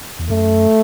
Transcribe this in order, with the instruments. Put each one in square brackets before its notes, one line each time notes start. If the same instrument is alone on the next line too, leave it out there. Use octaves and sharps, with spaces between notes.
[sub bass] E2
[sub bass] F#2 [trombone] A3